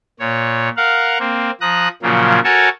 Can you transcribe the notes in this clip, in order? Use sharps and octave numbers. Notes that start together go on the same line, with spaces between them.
A#2 C#5
A#4 F5 F#5
A#3 C4
F3 A#5 D#6 F#6
A#2 C#3 F3 F#3 A#3
F#4 A4 A#4 C#5 G#5 A5